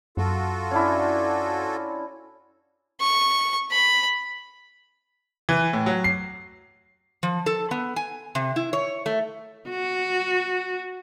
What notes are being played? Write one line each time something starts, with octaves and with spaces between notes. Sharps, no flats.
F#2 F4 F#4 A4
C#4 D4 E4
C#6
B5
E3
A2
F#3
C7
F3
A4
B3
G#5
C3
E4
C#5
A3
F#4